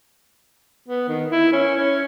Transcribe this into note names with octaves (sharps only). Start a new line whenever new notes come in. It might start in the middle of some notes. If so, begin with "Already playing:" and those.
B3
D#3
E4
C#4
C#4